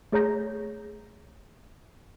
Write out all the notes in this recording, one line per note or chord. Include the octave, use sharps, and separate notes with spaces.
A3 G#4 C#5 A#5 G6 A#6